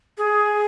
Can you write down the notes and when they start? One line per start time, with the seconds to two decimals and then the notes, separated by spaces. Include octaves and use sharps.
0.18 G#4